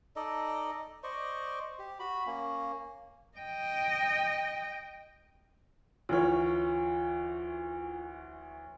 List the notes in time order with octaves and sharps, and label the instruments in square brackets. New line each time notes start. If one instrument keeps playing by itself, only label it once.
[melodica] D#4 A4 D5 D#5
C5 D5 D#5 C#6
G4
F#4 B5
A#3 C#4
[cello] D#5 G5
[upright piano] D2 E3 C#5 [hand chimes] F4 F6